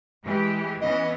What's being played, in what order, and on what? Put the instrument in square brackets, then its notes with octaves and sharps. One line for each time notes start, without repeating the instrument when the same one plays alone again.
[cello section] E3 G#3 G4
[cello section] E3 B3 C#4 [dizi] D#5